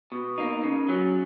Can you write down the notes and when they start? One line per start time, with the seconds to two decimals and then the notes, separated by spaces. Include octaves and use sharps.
0.12 B2
0.38 A#3 D#4
0.63 C#3
0.89 F#3 C#4